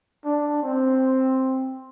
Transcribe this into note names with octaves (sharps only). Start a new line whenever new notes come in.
D4
C4